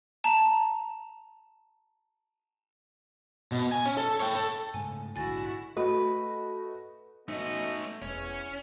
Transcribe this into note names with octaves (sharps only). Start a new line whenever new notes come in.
A5 A#5
B2
G#5
C#4
A4
C#5 G5
A4
G#2 C#3 A3 G#5
A#1 G#2 D3 E4 F#4 G#5 A6
A3 F#4 B4 D#5
A3 B3 C#4 D#4 F#4 D#5
E1 E2 C#4 C#5